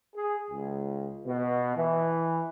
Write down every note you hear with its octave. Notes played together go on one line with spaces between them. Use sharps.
G#4
C#2
B2
E3